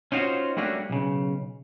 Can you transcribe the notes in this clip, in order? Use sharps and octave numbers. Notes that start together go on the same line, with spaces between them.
C#4 D#4 F4 F#4 C5
G3 A3 A#3 C#4 D4 F#4
B1 C#3